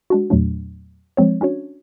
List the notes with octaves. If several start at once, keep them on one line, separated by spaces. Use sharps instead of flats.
G#3 D4 F#4
E2 A#2 F#3 A3 D4
F3 G#3 C4 C#5
C#4 D4 F#4 C#5